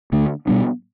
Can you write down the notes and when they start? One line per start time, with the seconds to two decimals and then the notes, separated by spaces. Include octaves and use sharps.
0.12 D2 D3 A3 D4
0.47 B2 G3 B3 D4